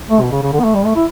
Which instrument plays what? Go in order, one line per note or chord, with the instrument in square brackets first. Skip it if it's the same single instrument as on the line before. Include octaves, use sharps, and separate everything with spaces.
[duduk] A3
B2
C#3
C#3
D3
B3
A3
G3
A3
E4